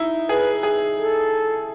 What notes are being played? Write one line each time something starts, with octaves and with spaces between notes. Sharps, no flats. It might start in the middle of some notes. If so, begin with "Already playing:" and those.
Already playing: D#4 E4
G#4 B4
G#4
A4